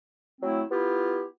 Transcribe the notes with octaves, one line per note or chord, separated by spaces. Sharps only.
F#3 A3 C4 E4
B3 E4 F4 G4